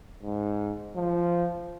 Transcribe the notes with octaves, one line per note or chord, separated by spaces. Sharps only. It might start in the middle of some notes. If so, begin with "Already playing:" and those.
G#2
F3